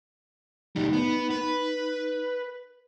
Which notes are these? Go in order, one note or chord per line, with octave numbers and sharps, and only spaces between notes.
D2 G3 D#4
B3
B4